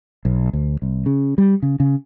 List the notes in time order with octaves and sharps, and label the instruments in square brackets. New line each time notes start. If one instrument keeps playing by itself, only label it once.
[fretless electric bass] B1
D2
C2
C#3
G3
C#3
C#3